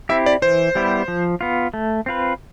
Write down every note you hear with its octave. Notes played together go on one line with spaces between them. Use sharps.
C4 E4 G4 E5
D5
E3 C5
G3 B3 E4 G4
F3
B3 F4
A3
C4 F4 B4